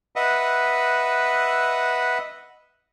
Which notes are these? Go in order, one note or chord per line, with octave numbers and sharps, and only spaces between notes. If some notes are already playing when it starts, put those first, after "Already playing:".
B4 D#5 E5 F#5